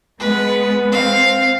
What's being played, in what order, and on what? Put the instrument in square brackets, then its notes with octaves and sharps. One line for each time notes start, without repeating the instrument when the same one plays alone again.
[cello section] G#3 B3 [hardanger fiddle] B4
[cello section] C4 [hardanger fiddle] F5